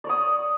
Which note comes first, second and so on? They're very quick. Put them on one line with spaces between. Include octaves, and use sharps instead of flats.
D5 C#5 D#6